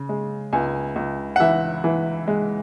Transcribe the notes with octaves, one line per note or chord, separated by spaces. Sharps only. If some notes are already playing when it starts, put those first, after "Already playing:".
Already playing: C#3
G#3
C#2 G#5
C#2
F#5
E3 E5
E3
G#3